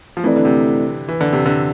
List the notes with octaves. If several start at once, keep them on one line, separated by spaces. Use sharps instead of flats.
F3
E3 A3 C4 E4 A4 D5
D3
C3
E3
D3
C3
D3